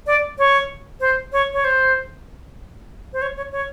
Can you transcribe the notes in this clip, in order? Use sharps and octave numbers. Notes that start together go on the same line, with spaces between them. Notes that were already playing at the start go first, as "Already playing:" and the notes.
D5
C#5
C5
C#5
C#5
C5
C5
C#5
C#5
C#5